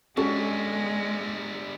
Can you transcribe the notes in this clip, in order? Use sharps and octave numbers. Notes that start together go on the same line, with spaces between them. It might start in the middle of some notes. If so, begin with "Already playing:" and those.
D3 G3 G#3 C#4 F#4 G4 A4